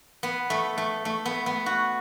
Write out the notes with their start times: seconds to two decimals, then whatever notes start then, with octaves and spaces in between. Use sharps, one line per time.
0.23 B3
0.50 A3
0.78 A3
1.05 A3
1.25 B3
1.46 B3
1.66 F#4